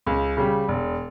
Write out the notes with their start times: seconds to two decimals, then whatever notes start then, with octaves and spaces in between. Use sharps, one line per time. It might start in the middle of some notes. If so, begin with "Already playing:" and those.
0.07 C#2
0.37 C#3 G3
0.68 E1